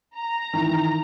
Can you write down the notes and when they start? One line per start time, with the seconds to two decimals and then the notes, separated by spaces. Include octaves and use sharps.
0.15 A#5
0.53 D#3 E3